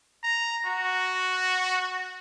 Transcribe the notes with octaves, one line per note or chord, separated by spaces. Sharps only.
A#5
F#4